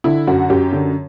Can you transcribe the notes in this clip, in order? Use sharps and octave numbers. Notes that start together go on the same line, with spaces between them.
D3 E4
F#2 F#4
F#2 G4
D3